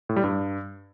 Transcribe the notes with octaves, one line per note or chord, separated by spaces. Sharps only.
A2
G3
G2